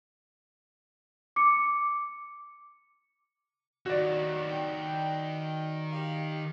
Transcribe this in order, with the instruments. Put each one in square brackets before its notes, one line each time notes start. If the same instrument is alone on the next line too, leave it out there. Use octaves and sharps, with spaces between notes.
[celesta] D6 C#7
[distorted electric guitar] D#3 C#5 [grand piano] F#4 D5
[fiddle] G5
G4 F5